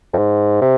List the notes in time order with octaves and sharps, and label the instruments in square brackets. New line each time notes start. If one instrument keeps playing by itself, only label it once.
[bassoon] F2
G#2
C3